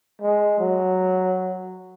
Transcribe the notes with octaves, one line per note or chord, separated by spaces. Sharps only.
G#3
F#3